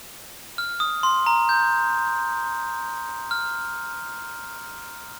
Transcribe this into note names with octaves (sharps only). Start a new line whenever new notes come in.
F6
D#6
C6
A#5
G6
F6